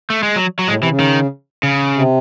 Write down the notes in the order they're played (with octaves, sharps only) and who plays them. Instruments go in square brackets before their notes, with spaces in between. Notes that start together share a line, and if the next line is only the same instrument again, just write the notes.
[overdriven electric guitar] A3
G#3
F#3
F#3
[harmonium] A2 [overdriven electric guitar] G#3
[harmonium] C3
[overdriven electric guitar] E3
[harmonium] C#3
[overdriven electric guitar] D#3
C#3
[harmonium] C3